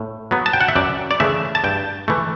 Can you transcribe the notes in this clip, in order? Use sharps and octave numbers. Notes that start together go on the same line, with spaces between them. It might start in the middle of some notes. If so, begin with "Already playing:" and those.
Already playing: A2
F#3 B3
A5
G5
F#5
E5
F#2 D5
D5
C#3 E3 A3 E5
A5
G2 G5
E3 A3